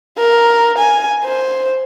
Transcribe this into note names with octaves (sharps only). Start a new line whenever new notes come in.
A#4
G#5
C5